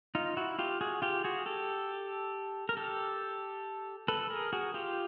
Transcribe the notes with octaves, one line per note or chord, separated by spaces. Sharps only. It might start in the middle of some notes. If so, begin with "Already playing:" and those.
D#4 F4
E4 F#4
F4 G4
F#4 G#4
F4 G4
F#4 G#4
G4 A4
A#4
G4 A4
A4 B4
G#4 A#4
F#4 G#4
F4 G4